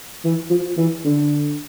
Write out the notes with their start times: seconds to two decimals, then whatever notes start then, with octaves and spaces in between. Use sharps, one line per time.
0.24 E3
0.50 F3
0.77 E3
1.05 D3